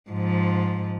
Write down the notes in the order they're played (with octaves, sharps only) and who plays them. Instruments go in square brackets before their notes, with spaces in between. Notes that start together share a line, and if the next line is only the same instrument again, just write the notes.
[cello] G#2 F3